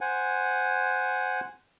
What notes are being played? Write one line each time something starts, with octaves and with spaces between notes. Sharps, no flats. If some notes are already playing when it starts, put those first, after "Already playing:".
C5 F#5 G#5